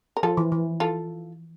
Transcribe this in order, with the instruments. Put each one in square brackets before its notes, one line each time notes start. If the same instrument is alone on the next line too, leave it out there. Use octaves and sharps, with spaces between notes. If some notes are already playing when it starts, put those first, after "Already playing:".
[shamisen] A#4
[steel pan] F3 [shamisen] F4 A4
[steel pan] E3
E3
[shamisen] F4 A4